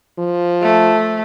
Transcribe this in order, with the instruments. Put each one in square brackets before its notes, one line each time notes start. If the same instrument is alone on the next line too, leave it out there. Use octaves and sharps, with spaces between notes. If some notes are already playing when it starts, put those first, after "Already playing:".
[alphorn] F3
[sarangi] A3